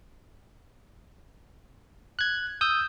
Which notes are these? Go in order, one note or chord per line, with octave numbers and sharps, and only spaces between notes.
F#6 G#6
D#6 E6 G6